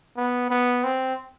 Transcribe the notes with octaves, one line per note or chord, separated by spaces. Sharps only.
B3
B3
C4